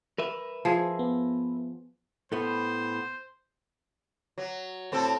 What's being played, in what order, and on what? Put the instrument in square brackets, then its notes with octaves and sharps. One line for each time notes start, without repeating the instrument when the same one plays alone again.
[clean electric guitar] A#4 B4 E5
[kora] F3 G#4
[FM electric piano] B3
[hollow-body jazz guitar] A2 A3 B3 [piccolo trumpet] C5
[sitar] F#3
A2 C4 A4